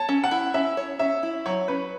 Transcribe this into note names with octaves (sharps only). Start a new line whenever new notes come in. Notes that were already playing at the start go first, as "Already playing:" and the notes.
Already playing: C#5 A5
C#4
F#5
E4
C#4 E5
C#5
C#4 E5
E4
F#3 C#5
C#4 B4